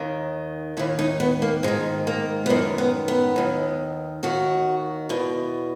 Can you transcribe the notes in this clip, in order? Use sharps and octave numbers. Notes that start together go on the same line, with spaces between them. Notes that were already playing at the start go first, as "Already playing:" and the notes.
Already playing: D#2 D#3
D#2 D#3 E4
D#4
B3
A#3
G#2 D#3 G#3
A#3
B3
F#2 D#3 A#3
B3
B3
D#2 D#3
D#2 D#3 F#4
E2 B2